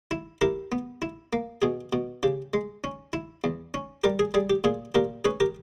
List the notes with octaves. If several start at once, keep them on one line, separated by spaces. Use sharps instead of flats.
E4
E4 G4 A#4
B3
E4
A#3
B2 G#4
B2
C#3 G4
G#3
C#4
E4
E2
C#4
G3 G4 A#4
G#4
G3 G#4
G4
A#2 G#4
A#2 G4 A#4
C#4 G#4 B4
G4 A#4